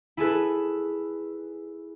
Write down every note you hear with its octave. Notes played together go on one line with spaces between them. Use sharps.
E4 G#4 A4 B4